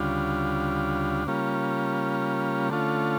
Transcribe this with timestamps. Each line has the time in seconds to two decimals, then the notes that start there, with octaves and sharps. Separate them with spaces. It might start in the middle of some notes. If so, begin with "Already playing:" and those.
Already playing: D2 C#3 G3 D4 F4
1.27 C#3 G3 A#3 C#4 F4
2.69 D3 A3 C#4 F4